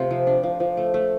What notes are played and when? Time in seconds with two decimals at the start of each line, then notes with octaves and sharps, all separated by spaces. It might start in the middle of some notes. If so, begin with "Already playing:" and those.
Already playing: C3 A3 C4 F4
0.11 F3
0.27 D4
0.43 F3
0.60 F3
0.77 A3
0.94 A3